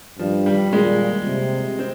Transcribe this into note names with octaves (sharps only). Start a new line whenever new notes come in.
G2 F3
G3
A#2 G#3
C3
C4